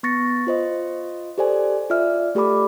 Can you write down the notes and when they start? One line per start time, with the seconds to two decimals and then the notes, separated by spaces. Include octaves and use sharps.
0.03 B3 C#6 A6 A#6 C#7
0.47 F4 C5 D#5
1.38 G4 A4 C5 D5 G#5
1.90 F4 D5 E5 F6
2.35 A3 G4 A4 D5 B5 D6